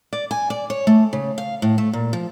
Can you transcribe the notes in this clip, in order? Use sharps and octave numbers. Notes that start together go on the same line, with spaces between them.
D5
G#5
D5
C#5
A3
C#3
F5
A2
A3
A#2
F3